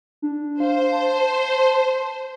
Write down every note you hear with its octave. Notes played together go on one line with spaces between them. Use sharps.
D4
C5 F5
A5